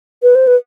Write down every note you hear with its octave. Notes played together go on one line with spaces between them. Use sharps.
B4
C5
B4